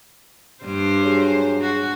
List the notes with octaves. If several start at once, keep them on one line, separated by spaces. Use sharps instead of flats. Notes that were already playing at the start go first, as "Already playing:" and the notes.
G2 G3 C5
F#3 G#4
F#4